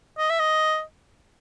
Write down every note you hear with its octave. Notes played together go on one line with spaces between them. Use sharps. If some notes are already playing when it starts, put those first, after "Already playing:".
D#5
E5
D#5